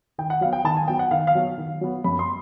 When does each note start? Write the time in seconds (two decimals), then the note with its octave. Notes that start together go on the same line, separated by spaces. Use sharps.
0.18 D#3 G5
0.30 F#5
0.41 F#3 B3 F5
0.53 G5
0.64 D#3 A5
0.77 G#5
0.88 F#3 B3 G5
0.99 F#5
1.11 D#3 F5
1.27 F5
1.35 F#3 B3
1.58 D#3
1.81 F#3 B3
2.04 F#2 B5
2.19 C6